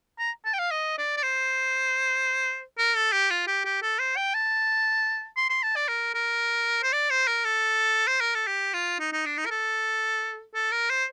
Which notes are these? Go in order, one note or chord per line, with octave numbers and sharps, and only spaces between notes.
A#5
A5
G5
F5
D#5
D5
D5
C5
A#4
A4
G4
F4
G4
G4
A4
C5
G5
A5
C6
C6
A5
D5
A#4
A#4
C5
D5
C5
A#4
A4
C5
A#4
A4
G4
F4
D#4
D#4
D4
D#4
A#4
A4
A4
A#4
C5